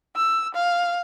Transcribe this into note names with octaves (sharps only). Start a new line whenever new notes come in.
E6
F5